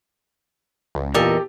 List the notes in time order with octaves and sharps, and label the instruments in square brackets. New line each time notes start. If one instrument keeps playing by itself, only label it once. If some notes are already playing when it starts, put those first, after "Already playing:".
[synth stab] C#2
[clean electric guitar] E2 A4 [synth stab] A#2 [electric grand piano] G4 [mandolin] A#4 D#5